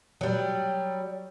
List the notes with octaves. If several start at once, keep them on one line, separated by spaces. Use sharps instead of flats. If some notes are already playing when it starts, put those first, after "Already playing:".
F#3 G3